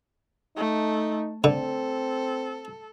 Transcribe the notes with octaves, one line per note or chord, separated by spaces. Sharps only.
A3 D#4
D3 C4 A4